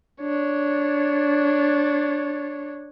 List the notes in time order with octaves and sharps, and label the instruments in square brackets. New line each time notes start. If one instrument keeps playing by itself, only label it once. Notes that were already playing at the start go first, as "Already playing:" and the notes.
[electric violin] D4 C#5